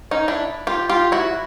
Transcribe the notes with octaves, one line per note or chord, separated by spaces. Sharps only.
C#4 D#4
D4 E4
F4 G4
F4 G4
E4 F#4